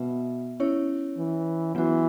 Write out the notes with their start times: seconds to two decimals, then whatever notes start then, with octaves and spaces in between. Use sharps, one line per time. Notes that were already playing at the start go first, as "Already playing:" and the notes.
Already playing: B2 B3 E5
0.60 C#4 E4 C#5
1.17 E3
1.75 E3 F#3 B3 F#4